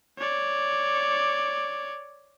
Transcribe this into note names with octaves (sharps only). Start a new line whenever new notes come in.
C#5 D5